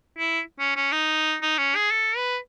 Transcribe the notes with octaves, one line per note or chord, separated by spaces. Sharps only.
E4
C#4
C#4
D#4
D#4
C#4
G#4
A4
B4